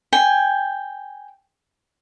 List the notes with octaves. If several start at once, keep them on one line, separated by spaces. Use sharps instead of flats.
G5 G#5